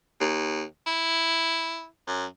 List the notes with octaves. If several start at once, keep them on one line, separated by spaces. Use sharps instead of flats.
D#2
E4
F#2